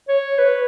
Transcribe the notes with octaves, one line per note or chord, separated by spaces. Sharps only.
C#5
B4